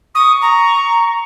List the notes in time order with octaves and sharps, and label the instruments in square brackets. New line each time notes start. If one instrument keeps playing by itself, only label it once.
[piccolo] C#6 [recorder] D#6
[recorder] A#5